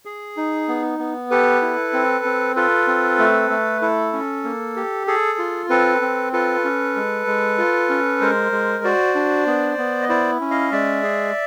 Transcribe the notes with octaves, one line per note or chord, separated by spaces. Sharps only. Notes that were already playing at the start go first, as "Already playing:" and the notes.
G#4
D#4
B3
B3
G4 A4 B4
E4
C4
C4
F4 A4 B4
C4
A3
A3
E4 A4
C#4
A#3
G4
G#4 A4
F4
C4 A4 B4
C4
F4 A4 B4
C#4
G#3
G#3
F4
C#4
G#3 A#4 C5
G#3
F#4 C5 D5
D4
B3
B3
D#5
E4 C5 D5
C#4
D#5 F5
G#3 D5 E5
G#4